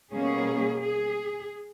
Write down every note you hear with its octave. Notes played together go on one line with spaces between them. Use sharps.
B2 G3 A#3 C#4 G#4
G#4